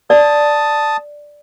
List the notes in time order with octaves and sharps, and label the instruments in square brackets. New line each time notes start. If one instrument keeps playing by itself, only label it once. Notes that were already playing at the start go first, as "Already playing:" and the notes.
[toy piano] D5 [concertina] A5 D#6